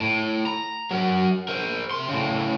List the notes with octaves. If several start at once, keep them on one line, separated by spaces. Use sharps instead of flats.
A2
A#5
F#3 A#4
A#4 C5
C3 C6
A2 C#3